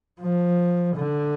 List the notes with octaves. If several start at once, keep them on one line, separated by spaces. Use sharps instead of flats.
F3
D3